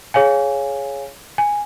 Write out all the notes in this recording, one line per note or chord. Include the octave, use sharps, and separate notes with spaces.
G#4 C#5 F5 G#5
G#5